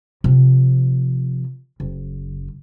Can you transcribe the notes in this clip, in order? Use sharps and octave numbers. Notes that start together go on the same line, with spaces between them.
C3 F3
F#1